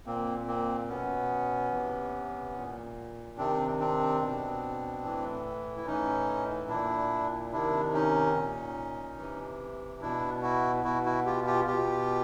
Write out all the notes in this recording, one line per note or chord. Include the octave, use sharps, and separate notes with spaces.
A#2 A#3 C4
A#3 C4
B2 B3 C#4
C3 E3
A#2
C3 D#3 C4 D4
C4 D4
B2
A2 E3
E4
A2 E3 C#4 D#4
A#2 D4 E4
C3 D#3 D4 E4
C#4 D#4
A#2
C3 E3
B2 D4 E4
E4 F#4
B2 E4 F#4
E4 F#4
F4 G4
F4 G4
B2 F4 G4